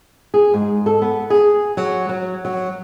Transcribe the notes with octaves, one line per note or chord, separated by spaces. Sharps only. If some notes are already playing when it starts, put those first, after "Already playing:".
G#4
G#2
A4
B3
G#4
F#3
F#3
F#3